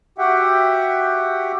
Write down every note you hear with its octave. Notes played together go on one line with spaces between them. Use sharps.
F#4 G4 E5 F#5 G5